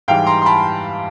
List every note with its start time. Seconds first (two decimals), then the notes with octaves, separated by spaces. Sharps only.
0.08 G#2 E3 G3 F5 G5
0.26 A#5 C6
0.42 C6
0.46 A5 B5